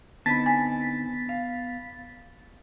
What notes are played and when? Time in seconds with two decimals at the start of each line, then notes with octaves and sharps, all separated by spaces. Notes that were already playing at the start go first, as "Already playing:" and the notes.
0.26 D3 B3 C4 D#4 A5 B5 A6 B6
0.46 G#5
1.29 F5